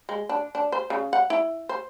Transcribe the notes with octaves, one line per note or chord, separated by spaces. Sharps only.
G#3
D4
D4
C5
C#3
F#5
E4
C5